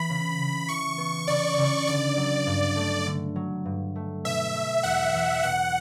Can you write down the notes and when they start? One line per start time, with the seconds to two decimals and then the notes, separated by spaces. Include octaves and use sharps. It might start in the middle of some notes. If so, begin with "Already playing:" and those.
Already playing: E3 B3 B5
0.10 C#3
0.39 C#3
0.68 E3 C#6
0.98 B3
1.28 C#3 D5
1.58 C#3
1.88 D3 D5
2.17 F#3
2.47 G2
2.76 A3
3.06 D3
3.36 F#3
3.65 G2
3.96 A3
4.24 B2 E5
4.54 A3
4.83 E2 F#5
5.14 E2
5.43 B2 F#5